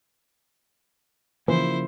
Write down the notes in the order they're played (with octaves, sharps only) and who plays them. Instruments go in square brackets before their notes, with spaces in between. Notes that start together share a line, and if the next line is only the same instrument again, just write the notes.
[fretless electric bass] C#3 F3 A#3 [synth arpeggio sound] E3 [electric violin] E4 C5